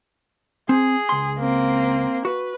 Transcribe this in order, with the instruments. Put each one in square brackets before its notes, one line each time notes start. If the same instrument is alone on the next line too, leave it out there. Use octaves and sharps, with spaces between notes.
[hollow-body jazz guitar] C4 [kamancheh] G#4
[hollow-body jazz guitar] C#2 C6
[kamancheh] A#3 C4
[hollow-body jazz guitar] F#4 [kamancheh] B4